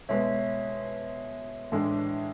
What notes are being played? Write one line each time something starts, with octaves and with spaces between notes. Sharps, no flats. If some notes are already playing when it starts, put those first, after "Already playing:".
B2 G#3 B3 C#5 E5
A2 E3 G#3 D4